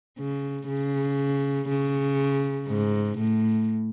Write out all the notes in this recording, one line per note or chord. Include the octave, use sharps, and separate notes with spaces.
C#3
C#3
C#3
G#2
A2